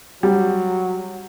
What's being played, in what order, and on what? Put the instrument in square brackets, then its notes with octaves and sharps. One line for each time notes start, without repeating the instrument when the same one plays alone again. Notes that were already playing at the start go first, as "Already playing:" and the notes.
[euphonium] F#3 [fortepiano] G3